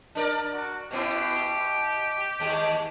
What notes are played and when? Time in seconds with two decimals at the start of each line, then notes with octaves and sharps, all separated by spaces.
0.15 D4 A#4 D5
0.52 F#4
0.91 B2 B3 E4 G4
2.40 D#2 G#3